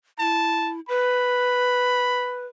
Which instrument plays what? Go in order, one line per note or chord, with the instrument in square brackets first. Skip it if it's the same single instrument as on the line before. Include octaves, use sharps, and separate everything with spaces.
[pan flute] E4 [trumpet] A5
[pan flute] B4 [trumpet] B5